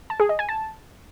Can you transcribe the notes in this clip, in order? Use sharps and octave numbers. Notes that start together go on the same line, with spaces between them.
A5
G#4
D#5
G#5
A5